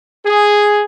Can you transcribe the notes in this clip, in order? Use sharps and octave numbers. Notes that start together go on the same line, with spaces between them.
G#4